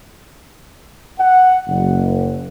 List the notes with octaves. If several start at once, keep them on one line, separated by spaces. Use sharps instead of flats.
F#5
F#1